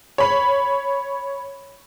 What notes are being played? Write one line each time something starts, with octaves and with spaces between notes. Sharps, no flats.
C#5 B5